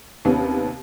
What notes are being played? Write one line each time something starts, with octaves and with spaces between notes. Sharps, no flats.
D#2 C3 B3 C#4